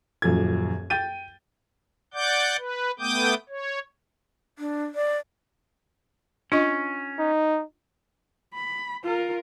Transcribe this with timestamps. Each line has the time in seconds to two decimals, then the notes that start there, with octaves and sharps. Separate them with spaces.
0.22 D#1 F#2 F3 A4 G#6
0.90 G5 G6 A6 D#7
2.14 D5 F#5 D6 G6
2.59 B4
2.99 A3 B3 G5 D6 D#6 G6
3.49 C#5
4.59 D4
4.95 D5
6.52 C#4 D4 F4 D#5
7.19 D#4
8.54 B5
9.04 F4 A#4